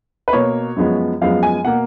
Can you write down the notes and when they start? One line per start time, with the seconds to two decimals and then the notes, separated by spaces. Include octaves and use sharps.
0.28 B4
0.33 B2 A#3 C#5
0.76 F#2 F3 G#3 B3
1.21 F#2 F3 G#3 B3 F5
1.43 G#5
1.65 B2 A#3 F#5